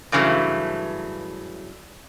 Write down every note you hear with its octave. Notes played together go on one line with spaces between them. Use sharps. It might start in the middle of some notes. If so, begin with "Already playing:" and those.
G2 C#3 E3 F#3 A3